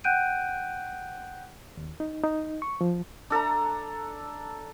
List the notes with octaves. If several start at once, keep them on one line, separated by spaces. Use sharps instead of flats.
F#5 G5 F#6 G6 D7 D#7
D#2
D#4
D#4
C#6
F3
D4 A4 A5 A#5